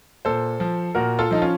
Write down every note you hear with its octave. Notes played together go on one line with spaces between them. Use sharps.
A#2 A4 C5
F3
A#2 F#4 A#4
F4 A4
F3 D#4
C#4 F4